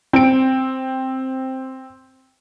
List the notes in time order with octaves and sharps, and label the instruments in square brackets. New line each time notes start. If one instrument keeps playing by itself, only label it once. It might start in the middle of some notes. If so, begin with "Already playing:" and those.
[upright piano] C4 D7